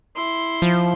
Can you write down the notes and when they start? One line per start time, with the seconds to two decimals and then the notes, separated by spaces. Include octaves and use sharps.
0.15 E4 C6
0.62 F3